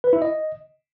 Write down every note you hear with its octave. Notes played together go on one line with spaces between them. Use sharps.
B4
E4
D#5